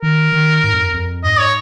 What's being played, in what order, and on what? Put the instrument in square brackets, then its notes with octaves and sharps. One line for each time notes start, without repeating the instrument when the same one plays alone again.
[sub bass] D#3 [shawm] A#4
[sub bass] D#3
G#2
F2
F2
[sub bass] G#2 [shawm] D#5
[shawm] C#5